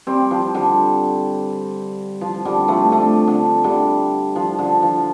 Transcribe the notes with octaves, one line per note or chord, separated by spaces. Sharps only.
G3 C4
F3
D3 G3
F3
D3 G3
F3 A3
A3 D4
D3
D3 G3
F3
D3
F3